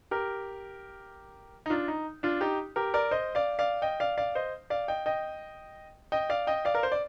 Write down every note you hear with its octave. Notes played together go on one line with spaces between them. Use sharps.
G4 A#4
D#4
D4 F4
D#4
D4 F4
D#4 G4
G4 A#4
A#4 D5
C5 D#5
D5 F5
D5 F5
D#5 G5
D5 F5
D5 F5
C5 D#5
D5 F5
D#5 G5
D#5 G5
D#5 G5
D5 F5
D#5 G5
D5 F5
A#4
C5
D5